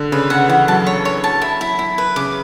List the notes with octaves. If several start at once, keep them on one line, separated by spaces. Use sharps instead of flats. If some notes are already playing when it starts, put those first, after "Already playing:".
Already playing: D3
C#3 B4
C#3 F#5
E3 F#5
F#3 A5
C#5
C#5
A5
E4
E4
E4
B4
C#3 D6